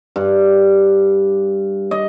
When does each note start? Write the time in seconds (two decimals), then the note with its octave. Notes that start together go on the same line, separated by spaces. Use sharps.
0.16 G2
1.91 D#5